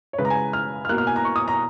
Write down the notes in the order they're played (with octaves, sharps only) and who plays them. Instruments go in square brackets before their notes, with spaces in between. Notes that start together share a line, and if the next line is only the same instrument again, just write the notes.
[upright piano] C#5
C#3 G#3 B4
A#5
G#5
F6
F6
A#3 F#6
B2
F6
G#5
A#5
C#6
D#6
A#5